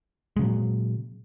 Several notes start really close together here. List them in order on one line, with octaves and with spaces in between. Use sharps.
G#3 C#3 F#3 A#2